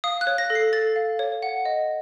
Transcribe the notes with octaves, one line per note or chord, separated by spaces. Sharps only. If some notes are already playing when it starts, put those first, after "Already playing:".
F5 D#6
F#6
C#5
A#6
A4
C7
A4 A6
F5
C#5
F#5
D#5